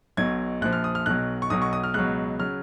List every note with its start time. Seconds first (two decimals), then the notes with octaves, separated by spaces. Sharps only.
0.17 B1 B2 F#3 G#6
0.61 A#1 A#2 F3 F#6
0.73 F6
0.84 D#6
0.95 F6
1.06 B1 B2 F#3 F#6
1.42 C#6
1.50 B1 B2 F#3 D#6
1.62 C#6
1.73 D#6
1.83 F6
1.94 C#2 B2 F#3 F#6
2.39 C#3 F#3 F6